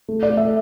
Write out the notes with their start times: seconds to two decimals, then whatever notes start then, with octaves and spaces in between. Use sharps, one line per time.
0.09 A3
0.23 D5
0.30 A3
0.37 E5